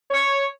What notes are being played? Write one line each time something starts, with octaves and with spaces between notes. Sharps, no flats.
C#5